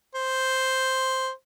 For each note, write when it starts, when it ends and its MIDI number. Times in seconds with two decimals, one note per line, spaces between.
0.15 1.30 72